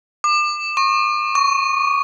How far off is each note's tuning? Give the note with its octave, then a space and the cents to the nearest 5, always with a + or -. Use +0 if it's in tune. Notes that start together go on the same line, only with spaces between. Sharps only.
D6 +35
C#6 -25
C#6 +20